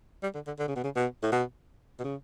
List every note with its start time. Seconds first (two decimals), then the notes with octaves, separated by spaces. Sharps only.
0.23 G3
0.34 D3
0.47 D3
0.59 D3
0.68 C#3
0.76 B2
0.84 C#3
0.96 B2
1.23 A2
1.32 B2
1.99 B2
2.04 C#3